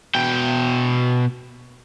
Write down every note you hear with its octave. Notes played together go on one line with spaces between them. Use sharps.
B2 G5